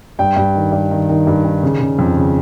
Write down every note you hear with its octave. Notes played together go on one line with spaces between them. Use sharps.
G2 G5
G2
D#3
G2
D#3
D#3
G2
D#3
C#3
C#3
F2
C#3